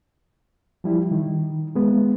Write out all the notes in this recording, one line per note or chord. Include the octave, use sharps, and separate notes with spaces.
F3 G3 E4
D#3
G#3 B3